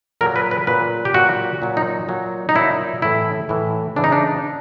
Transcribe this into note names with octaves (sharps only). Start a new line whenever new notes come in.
A#2 F#3 A#4
B4
B4
A#2 F#3 B4
G4
A#2 F#3 F#4
A#2 F#3
D#4
A#2 F#3
D#4
A#2 F#3 E4
A2 E3 E4
A2 E3
C#3 E3 D4
D#4
D4